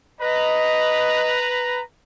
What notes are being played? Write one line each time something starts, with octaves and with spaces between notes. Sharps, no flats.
B4 D#5 A#5